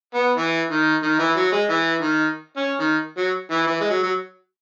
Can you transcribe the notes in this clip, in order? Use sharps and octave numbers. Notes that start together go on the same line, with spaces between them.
B3
E3
D#3
D#3
E3
F#3
G#3
E3
D#3
C#4
D#3
F#3
E3
E3
G#3
F#3
F#3